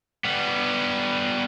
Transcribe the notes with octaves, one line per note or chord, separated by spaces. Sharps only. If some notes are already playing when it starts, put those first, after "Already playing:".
G3 B3